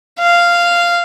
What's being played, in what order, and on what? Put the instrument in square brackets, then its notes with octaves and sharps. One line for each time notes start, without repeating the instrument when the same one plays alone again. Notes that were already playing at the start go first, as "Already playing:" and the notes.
[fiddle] F5